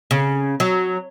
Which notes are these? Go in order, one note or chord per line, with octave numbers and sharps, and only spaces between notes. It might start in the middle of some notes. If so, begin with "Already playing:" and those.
C#3
F#3